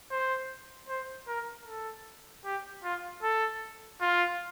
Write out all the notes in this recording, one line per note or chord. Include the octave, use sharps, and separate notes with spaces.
C5
C5
A#4
A4
G4
F4
A4
F4